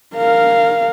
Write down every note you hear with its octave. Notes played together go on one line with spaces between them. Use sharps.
A#4 F5